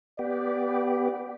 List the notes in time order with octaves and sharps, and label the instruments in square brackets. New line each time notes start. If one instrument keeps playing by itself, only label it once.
[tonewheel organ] B3 G4 [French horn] D5